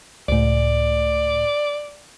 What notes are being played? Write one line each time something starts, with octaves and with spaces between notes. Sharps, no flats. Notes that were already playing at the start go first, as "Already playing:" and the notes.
C#2 A2 D5